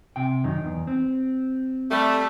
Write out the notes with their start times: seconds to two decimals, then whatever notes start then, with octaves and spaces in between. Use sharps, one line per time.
0.16 C3 G5
0.44 F#2 D#3 D#4
0.64 E2
0.87 C4
1.91 G3 A3